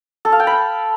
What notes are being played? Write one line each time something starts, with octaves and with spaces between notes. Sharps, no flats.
A4
F5
G5
B5